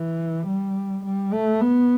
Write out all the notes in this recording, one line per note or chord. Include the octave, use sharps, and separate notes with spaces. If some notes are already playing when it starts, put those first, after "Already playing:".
Already playing: E3
G3
G3
A3
B3